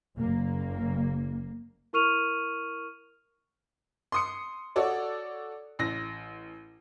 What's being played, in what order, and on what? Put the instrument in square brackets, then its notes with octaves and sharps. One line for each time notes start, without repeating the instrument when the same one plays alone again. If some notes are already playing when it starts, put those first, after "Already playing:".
[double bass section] F#1 A#3
[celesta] E4 A#4 C#6 F6 D#7 F7
[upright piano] C6 D#6 C#7
F#4 A4 C#5 D5
A1 A#6